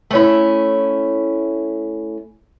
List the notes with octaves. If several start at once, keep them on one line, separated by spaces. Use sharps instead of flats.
A3 C#4 E4